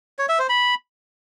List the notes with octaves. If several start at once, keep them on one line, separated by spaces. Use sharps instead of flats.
C#5
E5
C5
B5